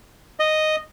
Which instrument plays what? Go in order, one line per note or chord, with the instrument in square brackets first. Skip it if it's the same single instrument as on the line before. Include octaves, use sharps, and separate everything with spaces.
[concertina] D#5